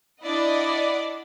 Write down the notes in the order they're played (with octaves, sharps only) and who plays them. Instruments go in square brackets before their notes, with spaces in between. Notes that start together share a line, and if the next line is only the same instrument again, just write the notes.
[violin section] D4 E4 D5 D#5 F#5